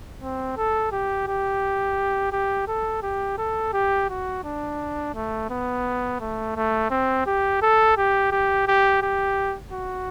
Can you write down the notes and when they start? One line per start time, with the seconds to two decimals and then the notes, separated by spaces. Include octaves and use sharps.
0.21 C4
0.57 A4
0.92 G4
1.27 G4
2.32 G4
2.68 A4
3.03 G4
3.38 A4
3.73 G4
4.09 F#4
4.44 D4
5.15 A3
5.50 B3
6.20 A3
6.56 A3
6.90 C4
7.26 G4
7.62 A4
7.97 G4
8.32 G4
8.68 G4
9.02 G4
9.72 F#4